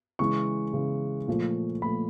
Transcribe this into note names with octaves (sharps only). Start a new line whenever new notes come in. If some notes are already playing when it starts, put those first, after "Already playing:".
C#3 E3 G#3 C#6
C#3 E3 G#3
A#2 F3 A3
A#2 F3 A3 B5